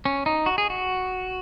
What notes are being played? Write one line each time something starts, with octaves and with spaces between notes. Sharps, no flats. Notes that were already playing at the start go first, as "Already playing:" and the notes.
C#4
D#4
F#4
G#4
F#4